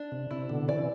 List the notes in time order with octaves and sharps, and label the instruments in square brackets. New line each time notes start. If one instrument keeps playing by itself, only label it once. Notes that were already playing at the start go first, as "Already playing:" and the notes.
Already playing: [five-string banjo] D4
[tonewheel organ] C3
[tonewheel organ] C3 [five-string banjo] E4
[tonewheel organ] B2 D3
[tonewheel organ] C3 E3 [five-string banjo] D5